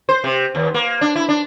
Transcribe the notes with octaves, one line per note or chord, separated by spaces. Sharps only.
C5
C3
D#2
A#3
D4
E4
D4